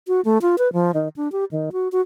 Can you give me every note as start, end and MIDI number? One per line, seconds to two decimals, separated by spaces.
0.08 0.21 66
0.25 0.38 57
0.42 0.56 65
0.58 0.72 71
0.73 0.91 53
0.94 1.08 51
1.16 1.31 62
1.32 1.45 67
1.51 1.70 51
1.72 1.88 66
1.92 2.01 66